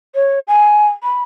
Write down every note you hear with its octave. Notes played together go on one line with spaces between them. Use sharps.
C#5
G#5
B5